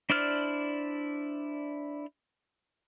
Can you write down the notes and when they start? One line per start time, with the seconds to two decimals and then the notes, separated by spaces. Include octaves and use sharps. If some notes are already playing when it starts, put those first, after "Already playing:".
0.10 D4 E4 C5 D5 F6